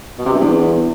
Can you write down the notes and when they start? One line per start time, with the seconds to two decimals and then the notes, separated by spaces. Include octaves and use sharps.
0.18 B2
0.26 C3
0.33 G2
0.40 E2